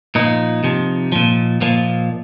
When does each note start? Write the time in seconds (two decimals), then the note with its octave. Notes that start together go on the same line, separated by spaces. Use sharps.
0.15 A#2 F3 D#4
0.64 C3 F3
1.12 A#2 F3
1.61 A#2 F3